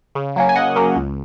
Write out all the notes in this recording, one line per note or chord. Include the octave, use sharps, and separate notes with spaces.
C#3
F#3 A#3 C#4
G#5
C#3 D#5 F#5
F#3 A#3 C#4
C#2